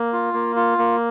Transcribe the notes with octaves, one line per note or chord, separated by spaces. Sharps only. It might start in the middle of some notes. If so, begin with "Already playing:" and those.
Already playing: A#3
F4
A#3
F4
A#3